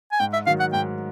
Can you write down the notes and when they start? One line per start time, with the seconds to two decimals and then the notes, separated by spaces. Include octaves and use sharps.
0.12 G#5
0.20 G#2 G5
0.33 E5
0.47 D#3 F#3 F5
0.60 F#5
0.73 G#2 G5